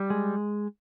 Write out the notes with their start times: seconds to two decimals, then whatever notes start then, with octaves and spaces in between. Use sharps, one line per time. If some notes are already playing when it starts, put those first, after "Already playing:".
Already playing: G3
0.10 G#3